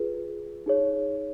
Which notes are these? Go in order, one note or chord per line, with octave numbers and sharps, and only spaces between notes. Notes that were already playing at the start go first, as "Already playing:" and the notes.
Already playing: F4 G#4 B4
D#4 G#4 C#5